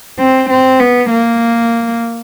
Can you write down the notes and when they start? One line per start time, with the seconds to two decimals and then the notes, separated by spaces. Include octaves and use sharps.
0.19 C4
0.51 C4
0.80 B3
1.11 A#3